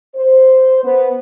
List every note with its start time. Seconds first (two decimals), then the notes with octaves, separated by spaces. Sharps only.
0.16 C5
0.83 B3